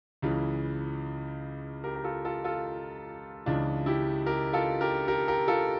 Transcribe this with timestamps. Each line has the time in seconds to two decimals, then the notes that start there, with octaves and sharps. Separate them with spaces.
0.22 C#2 C#3 E3
1.84 G4 A#4
1.96 A#4
2.04 F4 A4
2.25 F4 A4
2.44 F4 A4
3.46 C#2 C#3 E3 D4 F4
3.86 E4 G4
4.26 G4 A#4
4.53 F4 A4
4.81 G4 A#4
5.08 G4 A#4
5.28 G4 A#4
5.48 F4 A4